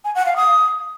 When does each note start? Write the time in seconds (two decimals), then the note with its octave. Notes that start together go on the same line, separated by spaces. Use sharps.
0.04 G#5
0.15 F#5
0.26 F5
0.36 D#6